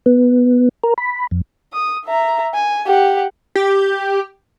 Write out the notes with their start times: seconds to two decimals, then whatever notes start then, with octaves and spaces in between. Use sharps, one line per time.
0.06 B3
0.84 A#4
0.98 B5
1.31 F2
1.73 D#6
2.06 E5 A#5
2.54 G#5
2.87 G4 F#5
3.55 G4